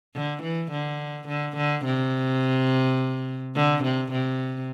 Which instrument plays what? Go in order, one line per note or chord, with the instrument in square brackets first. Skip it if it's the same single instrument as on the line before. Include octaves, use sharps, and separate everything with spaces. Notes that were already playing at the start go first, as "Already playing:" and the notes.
[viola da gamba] D3
E3
D3
D3
D3
C3
D3
C3
C3